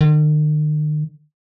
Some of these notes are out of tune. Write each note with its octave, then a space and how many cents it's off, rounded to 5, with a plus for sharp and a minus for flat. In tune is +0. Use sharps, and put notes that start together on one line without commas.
D#3 -45